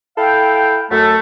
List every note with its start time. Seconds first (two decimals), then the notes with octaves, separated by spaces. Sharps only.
0.18 E4 A4 F5 G5
0.90 F#2 A3 A4